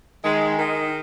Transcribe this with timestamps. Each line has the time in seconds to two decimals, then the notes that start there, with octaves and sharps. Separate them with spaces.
0.25 D#3 G#3
0.58 D#3